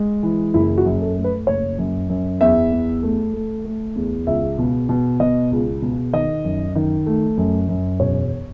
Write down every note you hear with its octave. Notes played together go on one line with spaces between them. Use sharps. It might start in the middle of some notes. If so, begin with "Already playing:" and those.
Already playing: G#3
E3
F#1 E4
F#4
F#2
A4
A3
B4
F#1 C#5
F#2
F#2
E2 E5
E2
A3
A3
A3
E2
C#2 E5
B2
B2
B2 D#5
C#2
B2
D#3 D#5
F#2
D#3
A3
F#2
F#2
E1 C#5